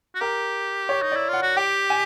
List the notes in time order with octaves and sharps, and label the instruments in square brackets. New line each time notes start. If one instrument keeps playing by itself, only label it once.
[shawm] F#4
[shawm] G4 [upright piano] A#4
[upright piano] C#5
[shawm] D#4
[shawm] E4 [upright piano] D5
[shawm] F4 [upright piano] F#5
[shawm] F#4
[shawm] G4 [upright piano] G5
[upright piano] G#5